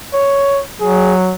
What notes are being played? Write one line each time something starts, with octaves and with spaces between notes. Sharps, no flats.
C#5
F#3 G#4